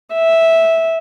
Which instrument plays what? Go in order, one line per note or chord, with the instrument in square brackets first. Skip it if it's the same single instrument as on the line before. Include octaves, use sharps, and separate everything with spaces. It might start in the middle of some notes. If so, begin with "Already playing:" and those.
[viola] E5